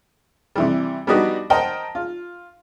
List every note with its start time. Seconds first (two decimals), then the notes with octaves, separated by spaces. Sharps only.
0.56 C3 E3 G3
1.07 G3 B3 D4 D#4 F#4 G4
1.50 A#4 C5 D#5 F#5 G5 A5
1.95 F4